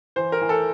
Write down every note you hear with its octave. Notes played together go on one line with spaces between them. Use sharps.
E3 C5
A#4
E3
A4